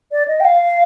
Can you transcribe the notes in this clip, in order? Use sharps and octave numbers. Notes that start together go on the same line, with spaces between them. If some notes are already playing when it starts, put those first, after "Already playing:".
D5
D#5
G5
F5